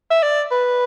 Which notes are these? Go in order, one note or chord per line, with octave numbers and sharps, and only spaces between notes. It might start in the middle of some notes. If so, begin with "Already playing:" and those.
E5
D5
B4